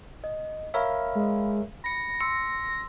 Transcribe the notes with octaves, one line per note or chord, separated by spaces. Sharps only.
D#5
A#4 C#5 E5 F5 B5
G#3
B5 A#6 C#7
C6 E6 C#7